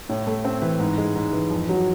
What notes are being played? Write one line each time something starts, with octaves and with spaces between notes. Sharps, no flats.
A2
A3
C4
E3
G#2
G#3
G#2
E3
F2
F#3